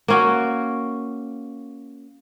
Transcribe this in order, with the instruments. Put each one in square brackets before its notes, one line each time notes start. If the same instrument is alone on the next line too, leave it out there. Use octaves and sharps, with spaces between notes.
[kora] A#3 C#4 F#4